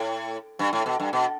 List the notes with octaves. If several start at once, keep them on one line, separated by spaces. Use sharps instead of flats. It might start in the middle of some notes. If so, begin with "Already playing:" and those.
Already playing: A2
G2
A2
B2
G2
B2